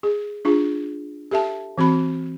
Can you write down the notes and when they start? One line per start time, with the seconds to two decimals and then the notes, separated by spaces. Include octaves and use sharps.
0.03 G#4
0.45 D4 F4 G#4
1.31 G4 A4 E5 A5
1.78 E3 C4 F#4 B5